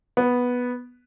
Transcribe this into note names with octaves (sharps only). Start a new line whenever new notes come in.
B3